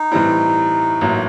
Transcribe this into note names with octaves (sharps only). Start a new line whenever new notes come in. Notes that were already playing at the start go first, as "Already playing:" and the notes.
Already playing: D#4
A2 E3 G3 C4 E4
A1 A2 F#3 A#3